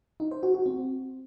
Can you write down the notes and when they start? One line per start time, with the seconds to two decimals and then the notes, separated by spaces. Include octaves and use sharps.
0.20 D#4
0.31 C5
0.43 F#4
0.54 F#4
0.66 C4